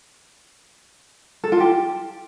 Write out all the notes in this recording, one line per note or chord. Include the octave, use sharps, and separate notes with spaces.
A4
F4
G4